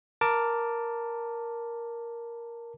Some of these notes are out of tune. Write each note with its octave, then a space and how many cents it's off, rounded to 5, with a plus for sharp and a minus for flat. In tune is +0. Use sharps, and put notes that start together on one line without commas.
A#4 +5 A5 +15 D6 -5